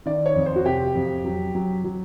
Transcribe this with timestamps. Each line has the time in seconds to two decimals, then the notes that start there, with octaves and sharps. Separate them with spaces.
0.06 D#3 D5
0.26 C#5
0.36 F2
0.46 C5
0.56 F#4
0.65 C3 G4
0.95 F2
1.24 F#3
1.55 F#3
1.84 F#3